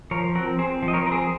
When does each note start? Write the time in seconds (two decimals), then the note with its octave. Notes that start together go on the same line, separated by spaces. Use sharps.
0.11 F3 A#4 C#5
0.35 C4 F#4 A#4
0.59 C4 G#4 C5
0.83 F3
0.88 D#5
0.94 A#4 C#5
1.06 C4 A#4
1.12 G#4 C5